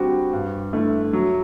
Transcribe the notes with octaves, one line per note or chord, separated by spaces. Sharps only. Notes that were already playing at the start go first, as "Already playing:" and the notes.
Already playing: D3 G3 C4 F#4
G2
D3 A3 E4
F#3